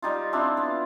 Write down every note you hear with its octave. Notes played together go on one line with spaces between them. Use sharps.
G3 D#4 F4
C4 D4 E4 F4
B3